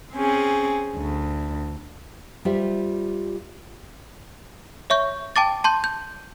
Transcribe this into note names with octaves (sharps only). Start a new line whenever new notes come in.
C4 C#4 G#4
D2
G3 F4 G4 C5 E5
C#5 E5 C#6 G6
G5 A5 D6 A6
A5 C6 G6
G6